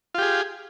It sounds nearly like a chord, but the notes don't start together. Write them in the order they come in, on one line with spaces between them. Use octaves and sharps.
F4 G4 G#4